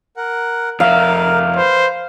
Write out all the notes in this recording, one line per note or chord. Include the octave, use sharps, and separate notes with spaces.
A#4 F#5
F2 A#4 E5 F5
B4 C5